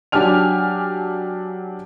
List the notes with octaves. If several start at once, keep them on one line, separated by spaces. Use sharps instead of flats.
F#3 D4 G4 G#5 F6 F7